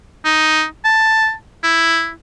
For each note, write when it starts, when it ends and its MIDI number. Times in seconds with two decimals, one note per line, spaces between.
0.25 0.65 63
0.84 1.33 81
1.63 2.11 64